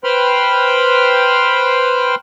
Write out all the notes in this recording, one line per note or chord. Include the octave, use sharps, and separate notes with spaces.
B4 C5 G5 B5 C6 F6